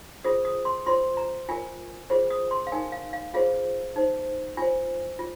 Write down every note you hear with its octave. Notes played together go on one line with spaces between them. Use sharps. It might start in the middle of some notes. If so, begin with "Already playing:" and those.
F4 G#4 C5 D#6
D#6
C6
F4 C5 C6
A#5
F4 A#4 G#5
F4 G#4 C5
D#6
C6
F5
D#4 A#4 G#5
F5
F5
F4 G#4 C5 F5
D#4 C5
F4 C5 G#5
F4